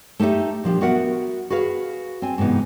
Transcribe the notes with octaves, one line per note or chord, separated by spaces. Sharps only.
A3 D#4 G4 A4 E5
A#2 F3 D4 G4
B3 F#4 A#4 E5 F#5
F#4 G#4 B4 F5
C4 G#5
G#2 C3 E3 B3 D#4